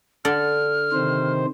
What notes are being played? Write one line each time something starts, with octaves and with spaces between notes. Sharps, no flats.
D3 A4 D5 F6
C3 D#3 C5